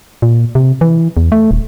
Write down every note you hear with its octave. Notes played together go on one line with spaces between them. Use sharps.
A#2
C3
E3
E2
A3
D#1